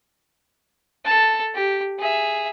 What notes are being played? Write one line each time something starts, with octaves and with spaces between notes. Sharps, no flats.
A4 A5
G4
G#4 E5